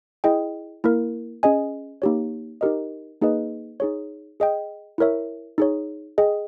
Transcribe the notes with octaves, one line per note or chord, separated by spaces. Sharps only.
E4 G#4 D#5 G5
A#3 E4 A#4
C#4 G#4 D#5 G#5
A#3 D#4 G4 C#5
D#4 G4 A#4 D#5
A#3 D#4 G#4 B4 D#5
D#4 G#4 C#5
G#4 D#5 G5
E4 A#4 C#5 E5
D#4 G#4 C#5
G#4 D#5 G5